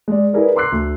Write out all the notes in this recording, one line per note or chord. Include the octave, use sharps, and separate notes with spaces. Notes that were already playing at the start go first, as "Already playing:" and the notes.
G#3 D5
E4 G#4 A#4 B4 D5
A#5 C6 D6 E6 F#6 C7
D2